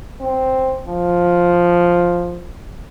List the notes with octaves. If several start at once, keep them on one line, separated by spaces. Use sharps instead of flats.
C4
F3